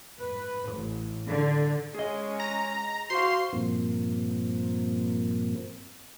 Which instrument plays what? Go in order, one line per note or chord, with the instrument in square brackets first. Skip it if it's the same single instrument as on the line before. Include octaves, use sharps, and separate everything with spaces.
[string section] B4
A1
D3
[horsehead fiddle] G#3 C#4 [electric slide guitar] G#4 D#5
[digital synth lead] A#5
[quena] F#4 [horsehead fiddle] C5 F5 [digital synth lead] C6
[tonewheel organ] G2 A#2 F3 A#3 C4